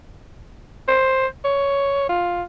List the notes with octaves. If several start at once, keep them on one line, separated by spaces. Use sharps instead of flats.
C5
C#5
F4